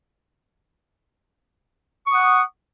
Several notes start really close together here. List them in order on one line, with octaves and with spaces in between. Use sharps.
C#6 D#6 F#5